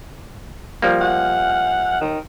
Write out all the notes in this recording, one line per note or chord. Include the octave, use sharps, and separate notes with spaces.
F3 G3 A#3
F#5
D#3